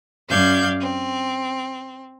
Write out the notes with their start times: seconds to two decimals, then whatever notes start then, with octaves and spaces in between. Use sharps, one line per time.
0.28 F#2 D5 F5 G6 G#6
0.80 C4